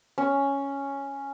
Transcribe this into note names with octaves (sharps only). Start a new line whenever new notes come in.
C#4